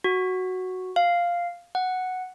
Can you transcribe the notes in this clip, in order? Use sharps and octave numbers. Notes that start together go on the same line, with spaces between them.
F#4
F5
F#5